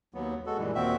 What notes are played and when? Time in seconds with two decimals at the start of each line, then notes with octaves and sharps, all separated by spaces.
0.14 D#2 F#3 B3
0.46 G#3 F#4 A4
0.58 F#2 A#2 E3 G3 G#3
0.75 D#2 A#2 D#3 C4 F#4 E5